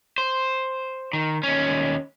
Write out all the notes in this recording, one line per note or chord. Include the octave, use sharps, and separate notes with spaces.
C5
D#3
D#2 C#4